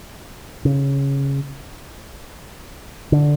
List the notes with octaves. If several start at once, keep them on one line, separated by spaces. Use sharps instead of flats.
C#3
D3